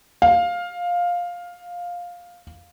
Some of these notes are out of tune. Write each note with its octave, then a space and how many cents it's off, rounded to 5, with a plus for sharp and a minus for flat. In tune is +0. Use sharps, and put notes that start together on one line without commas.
F5 +10